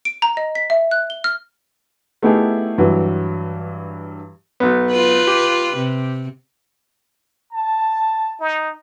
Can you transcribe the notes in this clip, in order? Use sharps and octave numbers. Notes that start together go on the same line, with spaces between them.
D7
A#5
D#5
B6
E5
F#6
G7
F6
A3 B3 D#4 E4 G4 G#4
G2 E3 F#3
B1 B3
F4 B4
G4
C3
A5
D#4